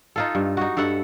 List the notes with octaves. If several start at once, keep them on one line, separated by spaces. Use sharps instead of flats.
D#4 F4 A4
G2
D#4 F#4
G2 A4 E5 F#5